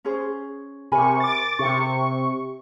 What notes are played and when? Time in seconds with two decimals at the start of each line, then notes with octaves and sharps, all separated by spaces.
0.05 C#4 G#4 C5
0.92 C3 A#4 G#5 B5 C#6
1.20 D6 A6
1.59 C3 C#6